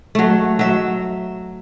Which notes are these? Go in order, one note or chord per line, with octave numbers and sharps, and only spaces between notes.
F#3 A3
F#3 E5